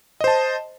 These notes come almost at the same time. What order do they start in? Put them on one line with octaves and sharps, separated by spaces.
D#5 C5 A5